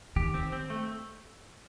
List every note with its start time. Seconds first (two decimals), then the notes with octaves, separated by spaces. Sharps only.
0.16 D#3 G4
0.34 C4
0.52 C4
0.70 A3